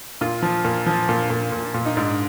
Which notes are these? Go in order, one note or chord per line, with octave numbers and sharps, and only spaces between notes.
A#2 F4
F3
A#2
F3
A#2
A#2
A#2
A#2
D#4
G#2 D4